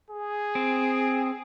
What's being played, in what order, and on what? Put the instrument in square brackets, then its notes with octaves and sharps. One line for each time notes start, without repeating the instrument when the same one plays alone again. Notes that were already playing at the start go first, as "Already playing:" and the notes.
[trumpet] G#4
[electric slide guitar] C4